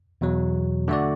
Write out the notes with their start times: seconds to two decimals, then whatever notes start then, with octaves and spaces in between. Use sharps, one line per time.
0.21 E2 B2 F#3
0.88 D3 A3 F#4 D5